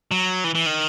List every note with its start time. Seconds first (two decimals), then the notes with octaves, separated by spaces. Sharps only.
0.11 F#3
0.44 E3
0.55 E3
0.66 D#3